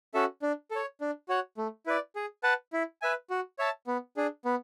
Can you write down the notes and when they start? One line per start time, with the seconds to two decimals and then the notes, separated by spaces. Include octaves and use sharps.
0.14 C#4 F#4 A4 E5
0.42 D4
0.71 A4 C#5
1.01 D4
1.29 F#4 C#5 F#5
1.57 A3
1.86 E4 B4 D5
2.16 G#4
2.43 B4 F#5 A5
2.73 E4
3.02 B4 E5 G#5
3.30 F#4
3.59 C#5 E5 A5
3.87 B3
4.17 D4 G#4
4.45 B3